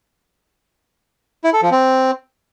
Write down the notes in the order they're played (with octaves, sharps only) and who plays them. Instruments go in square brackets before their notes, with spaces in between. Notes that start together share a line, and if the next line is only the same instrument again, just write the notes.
[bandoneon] E4
A4
F3
C4